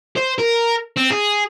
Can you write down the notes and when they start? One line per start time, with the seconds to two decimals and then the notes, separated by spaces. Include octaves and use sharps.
0.16 C5
0.38 A#4
0.96 C4
1.10 G#4